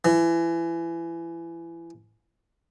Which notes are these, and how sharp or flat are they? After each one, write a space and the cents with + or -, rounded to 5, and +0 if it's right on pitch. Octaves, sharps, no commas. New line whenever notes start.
E3 +25